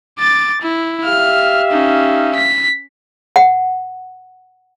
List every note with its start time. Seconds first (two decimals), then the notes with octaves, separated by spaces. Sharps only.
0.18 D6 A6
0.62 E4
1.05 G4 E5 F5 F6
1.71 C#4 D#4
2.35 B6
3.36 F#5